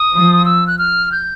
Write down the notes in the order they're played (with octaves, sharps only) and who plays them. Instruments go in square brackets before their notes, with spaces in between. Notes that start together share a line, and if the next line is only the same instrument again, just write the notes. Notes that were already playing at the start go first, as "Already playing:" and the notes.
Already playing: [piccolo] D#6
[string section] F3
[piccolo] E6
F#6
F6
G6